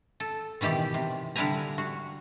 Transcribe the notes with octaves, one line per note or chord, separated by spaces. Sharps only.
A4
B2 D#3 E3 G4 D5
C3
D3 G3 D4 E4 G#5 A#5
F#4